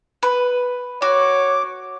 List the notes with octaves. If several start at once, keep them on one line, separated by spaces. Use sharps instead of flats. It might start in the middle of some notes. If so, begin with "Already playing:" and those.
B4
F#4 C#5 D6